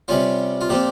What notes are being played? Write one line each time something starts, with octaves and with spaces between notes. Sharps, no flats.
C3 G3 C#4 F4
F4
A#2 F3 C4 G4